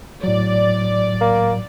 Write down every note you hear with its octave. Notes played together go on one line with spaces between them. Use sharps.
A2 F#3 D5
A#3